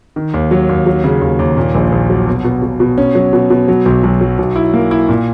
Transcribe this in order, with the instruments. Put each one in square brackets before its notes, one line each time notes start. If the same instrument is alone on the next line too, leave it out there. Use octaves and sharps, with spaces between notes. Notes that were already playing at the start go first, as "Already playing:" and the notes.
[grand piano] D#3
D#2
F#3
D#2
F#3
C#3
D#2
D#2
A#2
A#1
A#1
F#3
B2
B2
B2
B2
C#4
F#3
B2
B2
F#3
B1
B1
F#3
B1
E4
A#3
E4
A#2